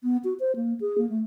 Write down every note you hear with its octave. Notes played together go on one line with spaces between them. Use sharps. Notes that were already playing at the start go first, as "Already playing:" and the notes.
B3
F#4
C5
A#3
G#4
A#3
A3